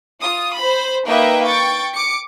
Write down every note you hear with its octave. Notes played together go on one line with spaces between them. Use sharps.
F4 D#6
C5 B5
A#3 D#4 B4 D#5 E5 G5
G5 C#6 A6
D6 C#7